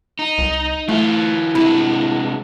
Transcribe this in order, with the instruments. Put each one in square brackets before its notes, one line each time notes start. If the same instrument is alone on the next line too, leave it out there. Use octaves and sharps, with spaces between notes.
[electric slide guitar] D#4
[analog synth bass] C2
[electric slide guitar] E3 F4 [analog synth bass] A3
[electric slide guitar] C3 G#3 D4 [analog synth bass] E4